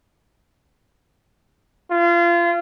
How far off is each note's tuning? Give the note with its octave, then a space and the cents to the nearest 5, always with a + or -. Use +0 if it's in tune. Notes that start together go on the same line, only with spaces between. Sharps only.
F4 -30